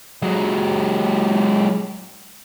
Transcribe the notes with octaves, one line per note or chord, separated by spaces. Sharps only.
F#3 G#3